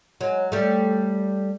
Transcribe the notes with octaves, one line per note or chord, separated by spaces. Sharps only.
F#3 G#3
G3 A3